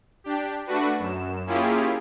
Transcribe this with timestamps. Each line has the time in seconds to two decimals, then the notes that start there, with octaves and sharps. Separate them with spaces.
0.24 D4 G4
0.67 A3 D4 F#4 B4
0.99 F#2 E7
1.46 A#3 C#4 E4 F4 G4 G#4